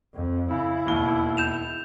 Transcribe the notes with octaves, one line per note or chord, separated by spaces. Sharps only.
F2
C#3 E4
E1 D#2 G7
G6 E7 F7